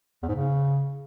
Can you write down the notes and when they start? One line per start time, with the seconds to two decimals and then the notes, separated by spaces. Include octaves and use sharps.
0.22 E2
0.29 G#2
0.35 C#3